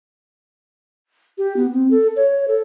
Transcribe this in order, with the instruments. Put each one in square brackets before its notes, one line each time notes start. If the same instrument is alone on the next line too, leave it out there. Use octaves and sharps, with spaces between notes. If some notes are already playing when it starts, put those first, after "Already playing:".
[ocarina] G4
B3
C4
A4
C#5
A4